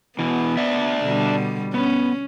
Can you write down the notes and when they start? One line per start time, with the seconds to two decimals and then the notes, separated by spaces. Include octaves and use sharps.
0.19 B2 E3 B3
0.57 D4 D5 E5
1.02 B2 D3 G3
1.74 B3 C#4